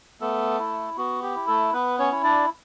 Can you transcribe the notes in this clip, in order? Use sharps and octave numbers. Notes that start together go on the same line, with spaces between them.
A3 B3 A4
E4
B3 F#4
G4
E4
A3 A4
B3 B4
C#4 C#5
E4
D4 D5